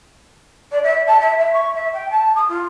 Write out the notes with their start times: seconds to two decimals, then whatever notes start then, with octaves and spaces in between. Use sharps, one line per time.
0.72 D5
0.83 E5
1.07 A5
1.20 E5
1.39 E5
1.53 C#6
1.74 E5
1.93 G5
2.10 A5
2.36 D#6
2.48 F4